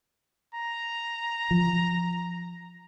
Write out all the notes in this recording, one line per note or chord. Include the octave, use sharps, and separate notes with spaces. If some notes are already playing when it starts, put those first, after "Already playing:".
A#5
F3